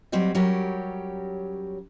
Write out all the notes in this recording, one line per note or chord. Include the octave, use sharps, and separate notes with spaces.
F#3 G3 C4 G4 D#5
F#3 G3 C#4 G4 A#4